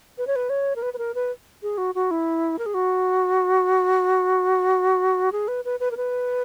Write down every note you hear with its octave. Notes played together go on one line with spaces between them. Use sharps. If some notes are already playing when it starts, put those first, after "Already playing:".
B4
C#5
B4
C#5
A#4
B4
B4
A#4
B4
G#4
F#4
F#4
E4
A#4
G#4
F#4
G#4
B4
B4
B4
A#4
B4